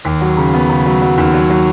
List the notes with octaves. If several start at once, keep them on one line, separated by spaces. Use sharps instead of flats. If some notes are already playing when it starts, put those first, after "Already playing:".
D#2
F#3
C#3
B3
C#3
F#3
F#3
D#2
F#3
F#3